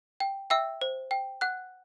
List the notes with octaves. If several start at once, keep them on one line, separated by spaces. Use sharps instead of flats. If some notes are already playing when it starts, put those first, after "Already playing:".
G5
E5 G5 E6
C5
G5
F#5 F#6